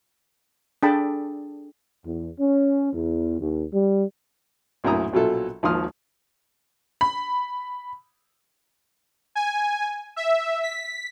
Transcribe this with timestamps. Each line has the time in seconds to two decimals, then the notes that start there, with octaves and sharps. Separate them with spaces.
0.83 D4 G#4 A4 G5 A5 B5
2.04 E2
2.39 C#4
2.93 E2
3.40 D#2
3.72 G3
4.84 A#1 F#2 A2 E4 A#5 D#6
5.13 A#1 B2 F#3 F4 A4 E5
5.63 G#1 D#2 F3 C6 D#6 F6
7.01 B5
9.35 G#5
10.16 E5
10.63 B6